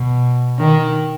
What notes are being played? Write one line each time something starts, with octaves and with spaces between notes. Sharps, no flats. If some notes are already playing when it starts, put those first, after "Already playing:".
Already playing: B2
D#3